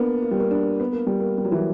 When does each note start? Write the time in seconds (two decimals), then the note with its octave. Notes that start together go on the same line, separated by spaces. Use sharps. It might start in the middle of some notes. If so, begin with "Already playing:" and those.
Already playing: A#3 B3 D4
0.22 A#3
0.31 G3
0.40 A#3
0.51 D4
0.80 B3
0.93 A#3
1.07 G3
1.19 A#3
1.38 G3
1.45 F#3
1.52 E3